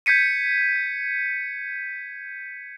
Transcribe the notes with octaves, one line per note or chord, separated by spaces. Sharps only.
G6 G#6 B6 C#7 D#7